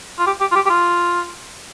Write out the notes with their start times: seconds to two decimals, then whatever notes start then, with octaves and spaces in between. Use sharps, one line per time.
0.19 F4
0.27 G4
0.41 G4
0.52 F4
0.56 G4
0.66 G4
0.70 F4